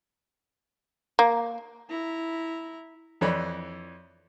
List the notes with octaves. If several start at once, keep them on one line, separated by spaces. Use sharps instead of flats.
A#3
E4 A#5
F2 E3 E4 C#5 D5 B5